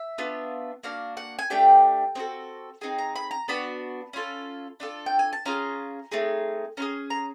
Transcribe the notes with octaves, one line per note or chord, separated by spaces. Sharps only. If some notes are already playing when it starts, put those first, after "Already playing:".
Already playing: E5
B3 D4 F4
A#3 D4 F#4 F5
F#5
G#5
A3 D4 G4 G5
C4 D#4 F#4 A4
C4 D#4 G#4 G#5
A#5
B5
A#5
B3 D4 F#4 B5
C#4 F4 A4
D4 F4 A4
G5
G#5
A5
C#4 F4 G#4 A#5
A3 C4 D#4 G#4
C#4 F4 G#4 A#5
A#5